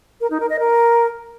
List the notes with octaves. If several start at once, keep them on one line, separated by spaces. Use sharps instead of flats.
A#4
D#4
A#4
D#5
A#4